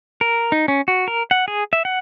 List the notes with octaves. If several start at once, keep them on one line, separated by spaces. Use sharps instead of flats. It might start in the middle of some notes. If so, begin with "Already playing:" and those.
A#4
D#4
C#4
F#4
A#4
F#5
G#4
E5
F#5